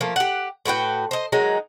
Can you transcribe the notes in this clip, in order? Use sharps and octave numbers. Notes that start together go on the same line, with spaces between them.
F3 A3 A#3
G4 F#5
A2 F#4 B4 G5
C5 D#5
D#3 F#3 G#3 D#4